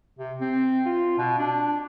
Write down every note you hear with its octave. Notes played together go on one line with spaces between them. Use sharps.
C3
C4
F4
B2
D4